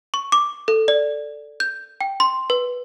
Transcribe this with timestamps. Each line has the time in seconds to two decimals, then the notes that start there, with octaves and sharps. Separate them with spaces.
0.14 C#6
0.32 D6
0.68 A4
0.88 D5
1.60 G6
2.01 G5
2.20 C6
2.50 B4